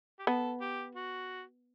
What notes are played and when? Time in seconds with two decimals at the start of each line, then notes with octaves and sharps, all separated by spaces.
0.19 G4
0.27 B3 A4
0.61 G4
0.95 F#4